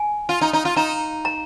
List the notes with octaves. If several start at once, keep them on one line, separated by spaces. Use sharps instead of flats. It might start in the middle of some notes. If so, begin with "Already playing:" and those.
Already playing: G#5
F4
D#4
D#4
F4
D#4 A#5
A#5